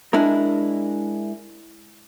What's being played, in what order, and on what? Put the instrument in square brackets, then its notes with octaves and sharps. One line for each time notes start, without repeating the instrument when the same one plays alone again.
[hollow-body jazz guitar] G#3 D4 E4 A#4